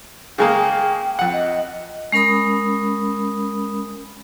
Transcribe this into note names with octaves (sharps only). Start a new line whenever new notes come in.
C#3 G#3 A#3 G5
F2 F#5
D#5
G#3 C#4 A#4 B5 D#6